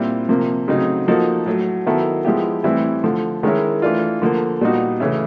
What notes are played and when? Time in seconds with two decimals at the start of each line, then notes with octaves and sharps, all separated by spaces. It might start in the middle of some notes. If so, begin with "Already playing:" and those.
Already playing: A#2 G3 C4 E4
0.29 C3 F3 A#3
0.68 C#3 F#3 A3 C4 D#4
1.08 F3 A#3 D#4 F#4 A4
1.46 A2 F#3 A3
1.86 D#3 F#3 B3 E4 A4
2.25 F3 G#3 B3 E4 G4
2.64 A2 E3 G3 C4 E4
3.04 D3 F3 A3
3.43 D#3 G#3 C#4 E4
3.82 E3 A3 D4 F4
4.22 D3 F3 A#3
4.61 A#2 G3 B3 D#4 F#4
5.00 C#3 E3 A3 C#4 E4